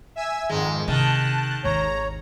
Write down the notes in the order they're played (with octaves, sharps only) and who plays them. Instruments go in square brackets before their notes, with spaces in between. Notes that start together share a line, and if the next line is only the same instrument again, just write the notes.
[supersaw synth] E5 G#5 E6
[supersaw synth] F2 G#2 D#3 [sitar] G#3
[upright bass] C3 C4 [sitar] D#3 [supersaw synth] A5 F#6
[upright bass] G#1 D#2 [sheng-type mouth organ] C#5 [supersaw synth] A#5